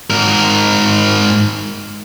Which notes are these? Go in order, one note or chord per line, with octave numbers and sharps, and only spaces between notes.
G#2 A#4